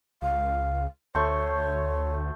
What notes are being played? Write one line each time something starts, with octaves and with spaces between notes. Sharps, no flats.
C#2 F5
D2 A3 C5 C#5 C#6